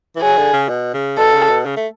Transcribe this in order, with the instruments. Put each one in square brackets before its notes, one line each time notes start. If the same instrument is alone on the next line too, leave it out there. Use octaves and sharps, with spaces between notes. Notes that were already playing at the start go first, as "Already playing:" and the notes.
[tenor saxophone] E3
[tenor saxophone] F#3 [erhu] G#4
[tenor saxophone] D3
C#3
B2
C#3
[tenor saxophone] B2 [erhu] A4
[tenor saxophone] C#3
B2
C#3
A3